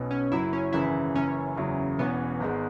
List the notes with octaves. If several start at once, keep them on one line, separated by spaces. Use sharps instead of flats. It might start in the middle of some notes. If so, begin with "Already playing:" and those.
Already playing: B1 B2 B3 C#4
C#4
F#1 F#2 F#3 E4
C#4
G#1 F#2 C#3 E3 E4
F#1 F#2 E3 C#4
F#1 E2 C#3 F#3 E4
E1 E2 E3 B3 C#4
G#1 G#2 G#3